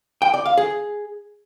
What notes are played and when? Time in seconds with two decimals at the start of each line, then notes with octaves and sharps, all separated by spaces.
0.22 G5
0.34 D5
0.46 F5
0.57 G#4